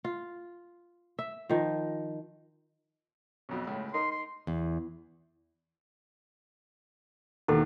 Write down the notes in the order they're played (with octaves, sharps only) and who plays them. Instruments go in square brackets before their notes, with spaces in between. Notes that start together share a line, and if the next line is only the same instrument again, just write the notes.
[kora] F4
E5
D#3 F3
[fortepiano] B1 F2 B2
C#2 A2
[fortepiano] D#4 A#4 [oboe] C6
[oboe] C6
[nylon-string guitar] E2
[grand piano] D#2 B2 [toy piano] E4 A4